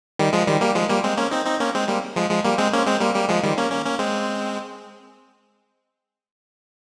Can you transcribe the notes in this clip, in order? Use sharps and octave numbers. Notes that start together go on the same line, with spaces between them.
D#3 G3
F3 G#3
D#3 G3
G3 A#3
F3 G#3
G3 A#3
G#3 C4
A#3 C#4
C4 D#4
C4 D#4
A#3 C#4
G#3 C4
G3 A#3
F3 G#3
F3 G#3
G3 A#3
G#3 C4
A#3 C#4
G#3 C4
G3 A#3
G3 A#3
F3 G#3
D#3 G3
A#3 C#4
A#3 C#4
A#3 C#4
G#3 C4